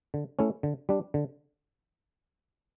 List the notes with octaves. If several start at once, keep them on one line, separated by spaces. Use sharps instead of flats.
D3
A3 C#4 E4
D3
G3 D4
D3